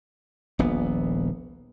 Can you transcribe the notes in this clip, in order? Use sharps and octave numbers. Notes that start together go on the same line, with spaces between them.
D#1 A#1 B3